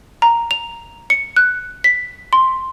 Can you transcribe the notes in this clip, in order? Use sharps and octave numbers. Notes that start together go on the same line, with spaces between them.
A#5
F7
C#7
F#6
B6
C6